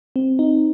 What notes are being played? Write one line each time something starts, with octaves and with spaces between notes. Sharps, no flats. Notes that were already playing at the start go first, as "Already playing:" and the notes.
C4
D#4